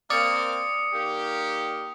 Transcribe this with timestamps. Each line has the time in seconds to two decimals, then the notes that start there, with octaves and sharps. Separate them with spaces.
0.10 A#3 C4 D5 D#6 C#7
0.93 D#3 A#3 G4